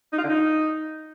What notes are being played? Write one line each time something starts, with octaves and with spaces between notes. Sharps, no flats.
D#4
F4
D3
D#4